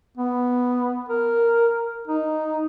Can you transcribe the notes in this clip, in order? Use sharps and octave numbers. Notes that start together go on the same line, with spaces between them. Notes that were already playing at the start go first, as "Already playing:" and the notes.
B3
A#4
D#4